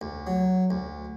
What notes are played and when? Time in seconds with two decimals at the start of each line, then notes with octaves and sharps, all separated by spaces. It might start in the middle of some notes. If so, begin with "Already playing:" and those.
0.01 D2
0.27 F#3
0.70 D2